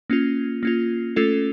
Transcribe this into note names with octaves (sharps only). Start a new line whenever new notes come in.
A#3 C#4 F4
A#3 C#4 F4
A3 C#4 F4 A4